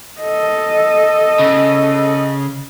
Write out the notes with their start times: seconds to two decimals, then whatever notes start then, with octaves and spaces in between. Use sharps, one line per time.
0.21 A4 D#5
1.39 C#3